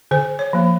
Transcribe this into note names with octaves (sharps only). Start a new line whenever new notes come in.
D3 C5
C#5
F3 A#3